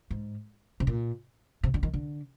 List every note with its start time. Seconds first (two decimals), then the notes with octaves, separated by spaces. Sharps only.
0.11 G#2
0.80 C3
0.87 A#2
1.63 C3
1.74 D3
1.83 D#3
1.93 D3